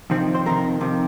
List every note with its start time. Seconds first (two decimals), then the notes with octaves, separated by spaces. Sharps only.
0.10 F2 C3 D#3 C4
0.35 C5
0.45 F2 C3 D#3 A#4
0.80 F2 C3 D#3